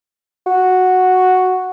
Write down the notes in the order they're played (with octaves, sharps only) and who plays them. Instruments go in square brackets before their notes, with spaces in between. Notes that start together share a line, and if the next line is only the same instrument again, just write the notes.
[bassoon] F#4